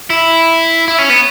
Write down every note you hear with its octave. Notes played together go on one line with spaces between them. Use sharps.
E4
E4
C#4
B3